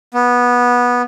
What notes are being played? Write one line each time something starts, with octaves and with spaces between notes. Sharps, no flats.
B3